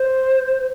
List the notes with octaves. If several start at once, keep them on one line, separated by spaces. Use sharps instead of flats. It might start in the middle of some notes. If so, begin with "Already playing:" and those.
Already playing: C5